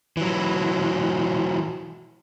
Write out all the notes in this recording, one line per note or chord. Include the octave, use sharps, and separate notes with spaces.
E3 F#3